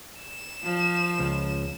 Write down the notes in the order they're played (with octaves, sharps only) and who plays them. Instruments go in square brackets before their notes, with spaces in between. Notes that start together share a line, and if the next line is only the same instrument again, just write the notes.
[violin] E7
[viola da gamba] F3
[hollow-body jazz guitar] C#2